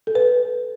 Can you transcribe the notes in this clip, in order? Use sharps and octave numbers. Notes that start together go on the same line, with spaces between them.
A4
B4